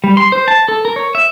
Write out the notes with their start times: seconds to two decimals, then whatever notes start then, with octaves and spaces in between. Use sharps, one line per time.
0.04 G3
0.17 C6
0.32 C5
0.48 A5
0.68 A4
0.85 A#4
0.96 C#5
1.15 E5